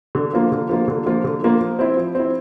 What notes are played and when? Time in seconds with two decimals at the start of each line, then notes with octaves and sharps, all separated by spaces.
0.15 D3
0.33 F3 A#3 F4
0.52 D3
0.69 F3 A#3 F4
0.88 D3
1.06 F3 A#3 F4
1.24 D3
1.42 F3 A#3 F4
1.61 F3
1.79 C4 E4
1.97 F3
2.15 C4 E4